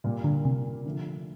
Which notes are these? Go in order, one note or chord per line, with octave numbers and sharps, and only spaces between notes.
A#2 G3 A#3
D3
C3
D3 F3 A3